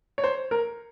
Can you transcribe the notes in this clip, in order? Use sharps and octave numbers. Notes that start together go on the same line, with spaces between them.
C#5
C5
A#4